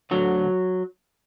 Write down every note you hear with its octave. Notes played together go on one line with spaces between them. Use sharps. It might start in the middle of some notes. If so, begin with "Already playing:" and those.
D2 D3 F#3